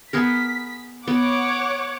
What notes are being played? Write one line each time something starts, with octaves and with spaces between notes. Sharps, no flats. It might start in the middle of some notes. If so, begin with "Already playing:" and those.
B3 G#4 A#4 B6
B3 C#5 F#5 D6